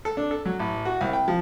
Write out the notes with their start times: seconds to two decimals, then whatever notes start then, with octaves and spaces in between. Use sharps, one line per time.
0.05 A4
0.17 D4
0.31 A4
0.46 F#3
0.59 A1
0.85 F#4
1.01 C2
1.13 G5
1.28 F3